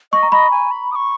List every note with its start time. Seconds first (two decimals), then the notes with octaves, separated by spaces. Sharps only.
0.12 D#5 C#6
0.23 A#5
0.32 D#5 B5
0.51 G#5
0.71 B5
0.92 D#6
0.95 C#6